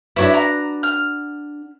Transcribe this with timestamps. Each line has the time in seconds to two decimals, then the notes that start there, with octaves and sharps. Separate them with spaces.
0.16 D4 E4 F#4 B4 C#5 E5
0.34 A#5
0.83 F6